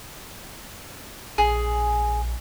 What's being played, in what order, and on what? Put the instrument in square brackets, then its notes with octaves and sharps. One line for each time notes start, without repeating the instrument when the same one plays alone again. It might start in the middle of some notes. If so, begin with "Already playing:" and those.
[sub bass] A#1 [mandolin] G#4